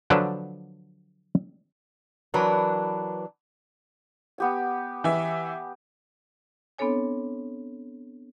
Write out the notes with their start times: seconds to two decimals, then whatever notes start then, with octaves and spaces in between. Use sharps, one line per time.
0.10 D3 F3 F#3 D4 A4 B4
2.34 E3 F#3 D4 A#4 B4
4.38 B3 G4 G#5
5.04 E3 E5
6.78 B3 C4 D4 A4 C#5 G#5